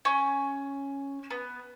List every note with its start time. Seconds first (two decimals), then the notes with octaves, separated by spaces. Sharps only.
0.05 C#4
1.31 B3